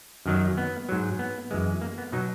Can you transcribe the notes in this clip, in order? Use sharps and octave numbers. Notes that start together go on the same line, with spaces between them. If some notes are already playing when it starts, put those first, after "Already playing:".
F#2 D#3 F#3
B3
G#2 F#3
B3
F#2 E3 G#3
A#3
B3
B2 F#3 D#4